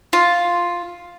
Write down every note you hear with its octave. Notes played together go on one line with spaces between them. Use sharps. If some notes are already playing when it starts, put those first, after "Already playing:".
F4